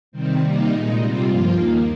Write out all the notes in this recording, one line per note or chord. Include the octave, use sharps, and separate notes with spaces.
C3 D#3 G3 C4
C3 G3 A#3 D#4
A#2 G#3 D#4
C3 G3 C4 F4
G2 F3 A#3 F4
D#2 D#3 A#3